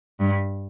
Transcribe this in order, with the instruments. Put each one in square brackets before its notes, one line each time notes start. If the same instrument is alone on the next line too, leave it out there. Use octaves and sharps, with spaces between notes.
[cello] G2